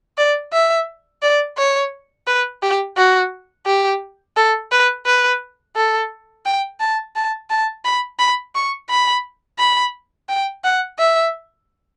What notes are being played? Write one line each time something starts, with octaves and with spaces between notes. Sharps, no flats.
D5
E5
D5
C#5
B4
G4
F#4
G4
A4
B4
B4
A4
G5
A5
A5
A5
B5
B5
C#6
B5
B5
G5
F#5
E5